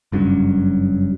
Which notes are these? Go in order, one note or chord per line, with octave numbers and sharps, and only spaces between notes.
F#1 G2 F#3 C#4